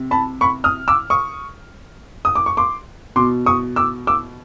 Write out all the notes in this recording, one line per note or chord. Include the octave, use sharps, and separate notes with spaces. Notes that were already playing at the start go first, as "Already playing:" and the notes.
Already playing: C3
A5 B5
B5 C#6
D#6 F6
D6 E6
C#6 D#6
D#6
D6
C#6
C6 D6
B2 C6 D6
C#6 D#6
D6 E6
D6 E6